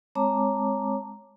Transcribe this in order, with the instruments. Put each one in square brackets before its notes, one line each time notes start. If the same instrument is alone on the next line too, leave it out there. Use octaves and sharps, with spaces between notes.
[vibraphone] G#3 C4 C#5 A5 A#5 D6